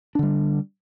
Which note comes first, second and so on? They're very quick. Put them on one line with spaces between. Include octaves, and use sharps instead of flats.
D4 D3 G3